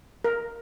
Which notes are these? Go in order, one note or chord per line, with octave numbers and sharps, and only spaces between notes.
A#4